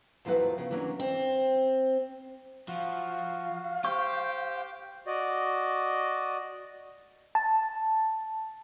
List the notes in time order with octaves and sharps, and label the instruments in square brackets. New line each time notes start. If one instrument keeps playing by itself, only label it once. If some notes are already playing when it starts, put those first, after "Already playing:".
[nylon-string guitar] D#2 F3 F#3 E4 B4 F#5
C#3 B3
E3 F#3 A#3 C#4 D4
[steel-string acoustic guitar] C4
[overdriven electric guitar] F3 [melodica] F#4 [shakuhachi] F5
[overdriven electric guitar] G4 [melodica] C5 G5 [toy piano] C#6
[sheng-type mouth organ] F#4 D5 D#5
[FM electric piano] A5